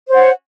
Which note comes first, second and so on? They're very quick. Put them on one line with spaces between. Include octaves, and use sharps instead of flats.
C5 C#5 F#5